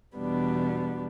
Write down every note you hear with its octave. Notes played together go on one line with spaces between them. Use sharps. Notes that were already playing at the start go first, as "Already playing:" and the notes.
E2 B2 G3 B3 D4